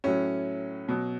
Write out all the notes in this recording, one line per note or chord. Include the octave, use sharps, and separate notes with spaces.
A2 F#3 C#4
B2 F#3